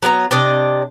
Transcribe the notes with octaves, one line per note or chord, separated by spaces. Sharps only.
F#3 B3 D5 A#5
C3 D4 D5 D#5